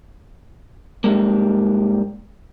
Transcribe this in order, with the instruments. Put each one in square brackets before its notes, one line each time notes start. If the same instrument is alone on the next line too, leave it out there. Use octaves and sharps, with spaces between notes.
[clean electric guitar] G#2 D#3 G3 G#3 A#3